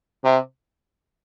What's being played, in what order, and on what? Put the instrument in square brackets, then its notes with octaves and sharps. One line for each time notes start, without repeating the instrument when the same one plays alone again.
[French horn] C3